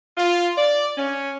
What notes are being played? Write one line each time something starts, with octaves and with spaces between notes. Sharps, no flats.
F4
D5
C#4